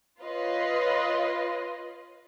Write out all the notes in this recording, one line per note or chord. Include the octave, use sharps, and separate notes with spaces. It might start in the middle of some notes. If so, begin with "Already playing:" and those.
F4 B4 C#5 D#5 C6